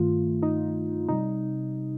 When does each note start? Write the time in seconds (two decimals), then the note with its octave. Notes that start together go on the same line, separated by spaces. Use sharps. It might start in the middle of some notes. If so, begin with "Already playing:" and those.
Already playing: G2 D#3 A3 F4
0.42 D#4
1.09 C3 G3 D#4